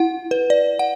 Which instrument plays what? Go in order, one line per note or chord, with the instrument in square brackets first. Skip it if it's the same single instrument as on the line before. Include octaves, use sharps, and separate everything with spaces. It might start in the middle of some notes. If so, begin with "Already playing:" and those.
Already playing: [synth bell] E4 F#5
B4
D5
F#5